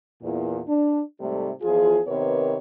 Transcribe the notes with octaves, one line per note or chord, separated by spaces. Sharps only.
E2 A#2
D4
G#2 C3 G3 A3
E2 F3 F4 G#4
C3 D#3 B3 A#4 B4 C#5